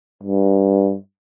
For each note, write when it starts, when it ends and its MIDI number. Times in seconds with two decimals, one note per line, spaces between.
0.23 0.95 43